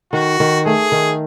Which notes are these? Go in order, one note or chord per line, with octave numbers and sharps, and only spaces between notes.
D#3 F#4
D#3
A3 G#4
D#3